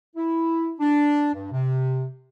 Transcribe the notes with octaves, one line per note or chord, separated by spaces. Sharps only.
E4
D4
G2
C3